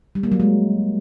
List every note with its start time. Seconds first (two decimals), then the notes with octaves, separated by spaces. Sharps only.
0.15 G3
0.23 A#3
0.32 F#3
0.40 G#3